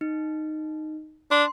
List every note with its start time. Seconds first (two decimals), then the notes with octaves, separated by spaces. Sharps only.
0.01 D#4
1.31 D4 C6